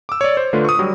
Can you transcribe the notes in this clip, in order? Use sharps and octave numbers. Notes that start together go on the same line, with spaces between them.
D6 E6
C#5 D5
C5
D3 A3 F4 B4
C#6 D#6
F#3 G3